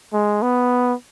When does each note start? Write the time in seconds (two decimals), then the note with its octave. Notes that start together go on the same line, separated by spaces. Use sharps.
0.13 G#3
0.42 B3